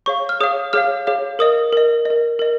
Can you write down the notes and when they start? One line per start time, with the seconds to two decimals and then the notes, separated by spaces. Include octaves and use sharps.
0.06 G#4 C#5 F5 C#6
0.29 F6
0.40 G#4 C#5 F5 D#6
0.73 G#4 C#5 F5 F6
1.07 G#4 C#5 F5
1.39 A#4 D#5 D#6
1.73 A#4 D#5
2.05 A#4 D#5
2.39 A#4 D#5